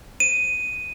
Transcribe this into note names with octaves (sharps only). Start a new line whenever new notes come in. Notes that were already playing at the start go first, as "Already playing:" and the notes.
D#7